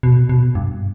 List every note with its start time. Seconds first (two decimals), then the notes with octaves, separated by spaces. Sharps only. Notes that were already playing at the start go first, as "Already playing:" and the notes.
0.03 B2
0.29 B2
0.55 G2